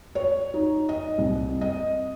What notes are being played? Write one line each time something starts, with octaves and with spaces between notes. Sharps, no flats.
C#5
D#4
D#5
C2
D#5